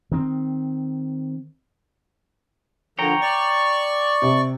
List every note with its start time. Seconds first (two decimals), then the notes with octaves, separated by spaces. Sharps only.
0.12 D#3 C4
2.99 D3 F3 A#3 C#5 G5 A#5
3.21 D5 C#6
4.22 C3